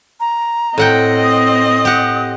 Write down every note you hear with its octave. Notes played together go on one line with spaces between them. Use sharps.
A#5
A2 C4 D#5 F#5 G5
D#6
G4 F#5